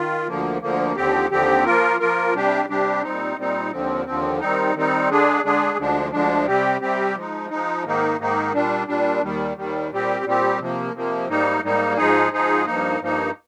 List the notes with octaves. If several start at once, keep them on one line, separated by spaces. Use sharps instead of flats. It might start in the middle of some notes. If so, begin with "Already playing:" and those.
Already playing: D#3 F4
D2 D3 F3 A#3
D2 D3 F3 A#3
D#2 D3 F3 C4 G4
D#2 D3 F3 C4 G4
F3 A#3 F4 A#4
F3 A#3 F4 A#4
C3 G3 D4 G4
C3 G3 D4 G4
A#2 G3 C4 D#4
A#2 G3 C4 D#4
D#2 D3 F3 C4
D#2 D3 F3 C4
D#3 G3 C4 D#4
D#3 G3 C4 D#4
D3 G#3 D4 G#4
D3 G#3 D4 G#4
D2 D3 F3 G#3 D4
D2 D3 F3 G#3 D4
C3 G3 C4 G4
C3 G3 C4 G4
F3 G#3 D#4
F3 G#3 D#4
G#2 D#3 A#3 D#4
G#2 D#3 A#3 D#4
A#2 G3 D4
A#2 G3 D4
D#2 D#3 G3
D#2 D#3 G3
A#2 G3 C4 G4
A#2 G3 C4 G4
C3 F3 A#3
C3 F3 A#3
G#2 G3 A#3 D#4
G#2 G3 A#3 D#4
G#2 F3 G#3 D#4 G#4
G#2 F3 G#3 D#4 G#4
G2 F3 A#3 D#4
G2 F3 A#3 D#4